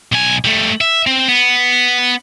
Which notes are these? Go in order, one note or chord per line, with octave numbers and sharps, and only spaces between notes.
B1 G#5
G3 A3
E5
C4
B3